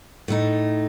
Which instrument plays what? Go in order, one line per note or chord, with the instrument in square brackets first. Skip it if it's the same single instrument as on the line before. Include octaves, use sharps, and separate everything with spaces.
[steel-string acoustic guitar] A2 A3 D#4